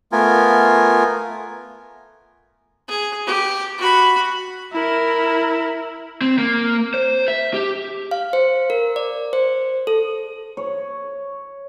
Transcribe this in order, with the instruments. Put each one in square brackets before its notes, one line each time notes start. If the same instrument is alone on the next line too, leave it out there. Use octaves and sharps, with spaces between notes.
[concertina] A3 B3 F4 A#4 G#5
[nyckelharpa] G#4
G4
F#4 B5
[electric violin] E4 A#4
[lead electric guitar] C4
A#3
C5
E5
G4
[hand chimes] F5
C5
A#4
D5
C5
A4
[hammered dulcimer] C#5